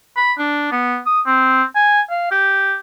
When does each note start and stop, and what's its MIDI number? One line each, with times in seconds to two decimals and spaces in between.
0.16 0.32 83
0.38 0.67 62
0.72 0.98 59
1.06 1.21 87
1.26 1.63 60
1.75 2.01 80
2.10 2.28 77
2.31 2.75 67